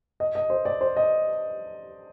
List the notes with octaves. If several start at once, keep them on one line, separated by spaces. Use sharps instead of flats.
D#5
D#5
C5
D5
C5
D#5